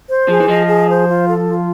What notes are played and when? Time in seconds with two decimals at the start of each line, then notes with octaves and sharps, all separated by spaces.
0.09 C5
0.28 F3 G#4
0.40 E3
0.48 F3 D#5
0.68 G#4
0.88 C5
1.07 F4
1.27 A4
1.46 F4